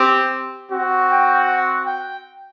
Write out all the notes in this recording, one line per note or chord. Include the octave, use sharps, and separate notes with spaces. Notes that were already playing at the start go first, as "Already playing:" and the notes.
Already playing: C4 G4
C4 F#4
G5
F#5
G5